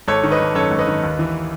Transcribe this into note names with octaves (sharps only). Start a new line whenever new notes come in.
G#1 A4 C#5
D#3
B4 D#5
G#1
F#2 A4 C#5
G#1
B4 D#5
D#3
D#2
E3